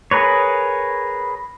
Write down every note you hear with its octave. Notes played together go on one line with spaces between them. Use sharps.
G#4 A#4 B4 C#5